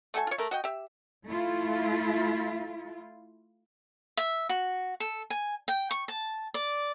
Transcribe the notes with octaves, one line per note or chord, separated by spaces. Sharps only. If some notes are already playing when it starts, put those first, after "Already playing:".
A3 F#4 A4 G#5
F4 C#5
A3 A#4
F#4 D#5 G5
G4 E5
A3 E4 F4
E5
F#4
A4
G#5
G5
C#6
A5
D5